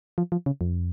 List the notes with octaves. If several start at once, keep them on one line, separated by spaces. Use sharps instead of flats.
F3
F3
C#3
F2